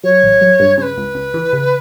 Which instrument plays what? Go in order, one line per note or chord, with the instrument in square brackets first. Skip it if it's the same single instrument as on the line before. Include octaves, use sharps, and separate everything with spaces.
[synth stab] F#3 [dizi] C#5
[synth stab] A1
F#3
G2
[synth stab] C#3 [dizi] C#5
[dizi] B4
[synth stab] C#2
C#2
E3
C#3